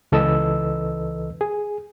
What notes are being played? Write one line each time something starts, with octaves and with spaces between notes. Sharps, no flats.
C#2 E3 A4 B4 D#5 E6
G#4